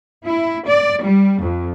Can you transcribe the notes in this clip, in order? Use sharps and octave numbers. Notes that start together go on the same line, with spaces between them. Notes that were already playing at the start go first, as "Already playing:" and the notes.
E4
D5
G3
F2